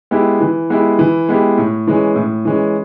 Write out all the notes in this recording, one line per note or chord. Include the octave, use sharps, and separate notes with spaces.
G#3 B3 E4 G4
E3
G#3 B3 E4 G4
E3
G#3 B3 E4 G4
A2
E3 G#3 C#4
A2
E3 G#3 C#4